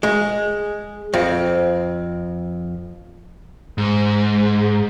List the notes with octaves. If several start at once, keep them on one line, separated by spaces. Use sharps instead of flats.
G#3
F2 C4
G#2